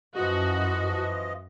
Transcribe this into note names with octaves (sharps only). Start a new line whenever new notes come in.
F#2 E3 F3 F#4 D#5